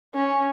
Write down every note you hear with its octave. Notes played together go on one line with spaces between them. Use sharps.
C#4